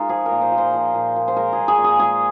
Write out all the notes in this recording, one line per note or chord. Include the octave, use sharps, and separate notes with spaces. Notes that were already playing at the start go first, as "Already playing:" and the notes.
Already playing: G#3 D#4 F4 A#4
F3 G#4
A#4
A#2
C5
A#2
C5
F3
A#2
A#2
C5
G#3 A#4
G#4
G#3
G#4
A#2
G#4
G#3 G#4